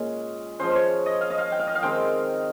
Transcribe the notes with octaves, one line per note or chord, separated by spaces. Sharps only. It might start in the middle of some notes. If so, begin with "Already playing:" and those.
Already playing: A#2 G#3 C#4
F3 G#3 C#4 C5
C5
C#5
D#5
F5
D#5
F5
G5
F5
D#5
F5
D#3 G#3 C4 G5